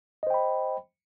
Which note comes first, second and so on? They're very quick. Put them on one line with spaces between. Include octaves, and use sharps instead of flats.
D#5 C5 G5 B5